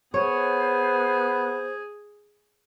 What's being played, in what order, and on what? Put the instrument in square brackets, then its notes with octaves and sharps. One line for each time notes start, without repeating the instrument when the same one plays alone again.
[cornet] B3 [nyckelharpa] G#4 [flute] C5 [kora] C#5